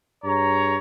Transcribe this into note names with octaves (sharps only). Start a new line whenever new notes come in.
G2 G#4 C#5 A#5